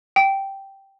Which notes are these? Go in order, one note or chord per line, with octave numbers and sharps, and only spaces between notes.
G5